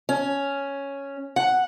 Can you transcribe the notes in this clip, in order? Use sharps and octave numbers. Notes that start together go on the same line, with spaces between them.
C#4
F#5